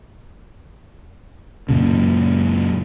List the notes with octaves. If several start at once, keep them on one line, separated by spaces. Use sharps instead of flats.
F#2 A#2 C#3